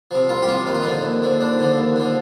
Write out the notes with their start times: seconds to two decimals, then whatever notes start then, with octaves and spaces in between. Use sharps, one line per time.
0.11 C3 F3
0.29 C2 F4
0.42 G4
0.48 C3 F3 F4
0.66 D#2 D#4
0.75 F4
0.82 D3 F3 D#4
1.03 D#2
1.22 D3 F3
1.41 D#2 D4
1.59 D3 F3
1.77 D#2
1.96 D3 F3